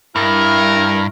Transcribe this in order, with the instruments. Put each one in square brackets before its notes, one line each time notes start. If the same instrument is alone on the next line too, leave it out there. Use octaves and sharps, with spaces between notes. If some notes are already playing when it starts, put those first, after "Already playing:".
[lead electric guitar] G2 [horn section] E4 A#4